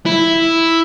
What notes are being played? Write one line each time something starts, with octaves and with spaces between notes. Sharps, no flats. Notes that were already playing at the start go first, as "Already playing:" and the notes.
E4